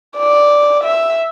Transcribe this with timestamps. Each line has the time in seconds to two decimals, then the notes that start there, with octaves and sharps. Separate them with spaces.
0.17 D5
0.84 E5